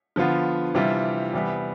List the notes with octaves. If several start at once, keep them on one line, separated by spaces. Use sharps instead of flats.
D3 F3 B3 F4
C3 E3 G3 D4 F4
E2 C3 G3 B3